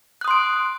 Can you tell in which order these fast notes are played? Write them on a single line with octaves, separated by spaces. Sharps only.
F#6 D#6 C6 D7